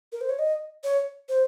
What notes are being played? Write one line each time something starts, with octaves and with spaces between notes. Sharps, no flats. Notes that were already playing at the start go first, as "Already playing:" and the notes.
A#4
C5
C#5
D#5
C#5
C5